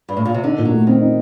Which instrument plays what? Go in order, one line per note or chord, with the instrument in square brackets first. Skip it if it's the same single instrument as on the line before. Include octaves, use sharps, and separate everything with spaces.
[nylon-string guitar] G2
A2
A#2
C3
[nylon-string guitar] D3 [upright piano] D#4
[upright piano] A#2
[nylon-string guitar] F#3
[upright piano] A3
[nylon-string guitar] D#3 [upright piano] C4
[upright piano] D#4